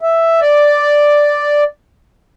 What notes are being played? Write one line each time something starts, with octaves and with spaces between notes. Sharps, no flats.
E5
D5